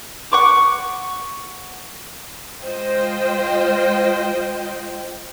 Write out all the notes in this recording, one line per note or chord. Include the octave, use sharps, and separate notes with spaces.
F#5 C#6 D6
G#3 F4 C5 D#5 G5